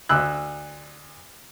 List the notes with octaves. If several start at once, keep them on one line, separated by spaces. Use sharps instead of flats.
D2 E6 F#6